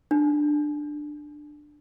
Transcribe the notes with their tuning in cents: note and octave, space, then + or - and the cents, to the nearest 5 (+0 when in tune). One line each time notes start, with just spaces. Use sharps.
D4 +15